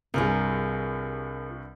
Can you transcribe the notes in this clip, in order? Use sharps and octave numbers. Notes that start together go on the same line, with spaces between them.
C2 G2 F4 G#4 A#4